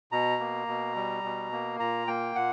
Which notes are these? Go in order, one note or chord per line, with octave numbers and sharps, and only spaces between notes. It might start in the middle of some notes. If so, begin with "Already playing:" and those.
B2 A#5
A#3
B2
G3
B2
A#3
A#2 A#5
A#3 G5
A#2 F#5